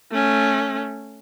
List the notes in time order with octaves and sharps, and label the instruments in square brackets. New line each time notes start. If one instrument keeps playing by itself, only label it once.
[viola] A3 C#4